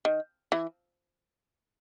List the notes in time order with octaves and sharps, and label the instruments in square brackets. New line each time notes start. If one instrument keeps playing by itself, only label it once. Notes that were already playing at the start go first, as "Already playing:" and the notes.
[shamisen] D#3
E3